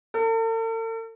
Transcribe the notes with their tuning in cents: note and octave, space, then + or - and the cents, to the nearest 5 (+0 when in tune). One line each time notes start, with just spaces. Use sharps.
A4 +45